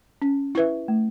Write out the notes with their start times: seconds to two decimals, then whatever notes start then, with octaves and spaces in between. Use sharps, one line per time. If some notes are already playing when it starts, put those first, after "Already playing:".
0.22 C#4
0.55 E4 B4 E5
0.88 A3